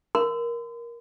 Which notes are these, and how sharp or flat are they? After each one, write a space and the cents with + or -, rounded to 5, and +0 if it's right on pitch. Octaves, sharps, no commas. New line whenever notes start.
A#4 +10 C6 -45